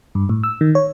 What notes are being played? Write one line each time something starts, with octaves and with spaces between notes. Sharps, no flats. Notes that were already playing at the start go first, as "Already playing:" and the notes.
G2
A2
E6
D#3
C#5